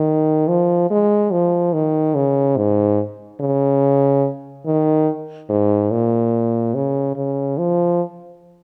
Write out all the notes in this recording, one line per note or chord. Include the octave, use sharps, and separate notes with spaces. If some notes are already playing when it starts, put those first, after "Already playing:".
Already playing: D#3
F3
G#3
F3
D#3
C#3
G#2
C#3
D#3
G#2
A#2
C#3
C#3
F3